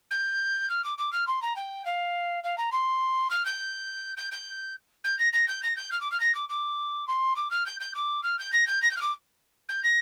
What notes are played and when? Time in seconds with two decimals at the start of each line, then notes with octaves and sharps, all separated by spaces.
0.10 G6
0.69 F6
0.84 D6
0.97 D6
1.12 F6
1.27 C6
1.42 A#5
1.55 G5
1.85 F5
2.43 F5
2.57 A#5
2.72 C6
3.30 F6
3.45 G6
4.16 G6
4.31 G6
5.04 G6
5.18 A#6
5.32 A#6
5.47 G6
5.62 A#6
5.76 G6
5.91 F6
6.00 D6
6.11 F6
6.19 A#6
6.34 D6
6.49 D6
7.07 C6
7.36 D6
7.50 F6
7.66 G6
7.80 G6
7.94 D6
8.23 F6
8.38 G6
8.52 A#6
8.66 G6
8.82 A#6
8.90 G6
8.96 F6
9.01 D6
9.68 G6
9.83 A#6